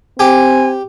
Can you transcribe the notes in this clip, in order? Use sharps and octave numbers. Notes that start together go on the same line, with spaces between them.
C4 G4 G#5